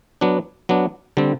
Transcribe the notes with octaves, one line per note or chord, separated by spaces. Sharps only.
F#3 B3 D4
F#3 B3 D4
D3 G3 C4